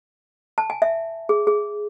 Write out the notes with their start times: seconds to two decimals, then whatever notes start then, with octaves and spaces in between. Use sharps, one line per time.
0.58 A5
0.70 G#5
0.82 E5
1.29 G#4
1.47 G#4